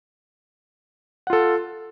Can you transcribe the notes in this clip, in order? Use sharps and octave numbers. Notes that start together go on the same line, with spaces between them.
F4 A4 F#5